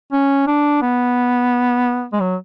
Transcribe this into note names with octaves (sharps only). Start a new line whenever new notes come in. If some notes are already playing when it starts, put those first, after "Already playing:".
C#4
D4
B3
G#3
F#3